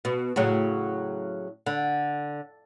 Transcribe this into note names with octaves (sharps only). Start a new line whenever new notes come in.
B2
A2 C#3 F#3
D3